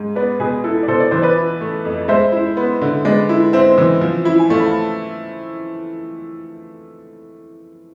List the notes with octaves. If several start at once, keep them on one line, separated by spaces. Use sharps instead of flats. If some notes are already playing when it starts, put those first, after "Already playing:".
Already playing: G#2
B3 B4 D5
B2 G#4 B4
E4 A4
D5
B2 A4 C5
D5
E3 C5
B4 D5
E4
A3
F2
G#3 C5 E5
E4
B3
D3
G#3 B4 D5
E4
C4 C5 E5
E3
F3
E4
G#5
A3 D5 F5
B5
F5 A5